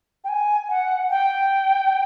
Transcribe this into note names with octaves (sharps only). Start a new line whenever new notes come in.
G5
G#5
F#5
G5